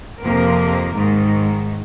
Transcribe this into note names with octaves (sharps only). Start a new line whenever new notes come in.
F2 C3 F3 A#3 A#4
G#2 D#3